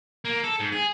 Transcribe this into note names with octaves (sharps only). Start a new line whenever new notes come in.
A#3
A4
G#2
G#4